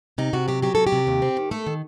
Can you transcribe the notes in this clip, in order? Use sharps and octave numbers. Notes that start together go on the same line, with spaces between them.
C3 D#4
C3 F#4
F#3 G4
F#3 G4
C3 A4
G4
C3
D#2
C4
D#3
A3 A4
D#3